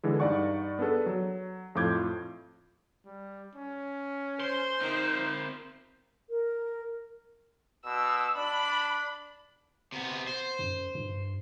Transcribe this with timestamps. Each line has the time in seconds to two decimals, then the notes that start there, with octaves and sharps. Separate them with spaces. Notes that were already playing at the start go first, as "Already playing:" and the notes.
0.03 D3 E3 G#3
0.20 G2 D#4 D5 F#5 C#6
0.79 B3 D4 G#4 A4 B4
1.06 F#3
1.75 F2 A2 F4 D6 G6 G#6
3.05 G3
3.55 C#4
4.41 C5 C6
4.81 C4 D#4 A#4
6.30 A#4
7.85 B2 E6
8.37 D4 B5
9.92 C3 B3
10.27 C5
10.59 F#2
10.95 G2